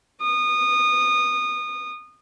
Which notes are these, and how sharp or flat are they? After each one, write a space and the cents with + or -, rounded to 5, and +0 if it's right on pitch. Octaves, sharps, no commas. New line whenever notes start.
D#6 -25